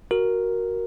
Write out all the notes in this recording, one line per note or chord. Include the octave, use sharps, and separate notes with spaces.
F#4 A#4